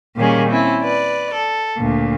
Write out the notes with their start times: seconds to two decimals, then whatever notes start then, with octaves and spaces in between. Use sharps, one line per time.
0.17 A#2 D#3 G3 A#3 C#4 G#4
0.49 C4 C#4 E4
0.82 B4 D5
1.35 A4
1.77 D2 A#2